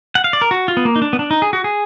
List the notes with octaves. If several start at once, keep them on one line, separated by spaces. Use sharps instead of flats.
F#5
F5
D5
A#4
F#4
F4
B3
A#3
D#4
D4
B3
D4
D#4
G#4
F#4
G#4